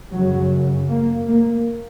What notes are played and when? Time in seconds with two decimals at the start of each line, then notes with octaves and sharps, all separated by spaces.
0.12 F#2 C#3 F#3
0.89 A#3
1.28 A#3